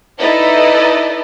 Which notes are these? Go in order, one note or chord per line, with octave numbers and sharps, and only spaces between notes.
D#4 E4 A4 B4 D5 D#5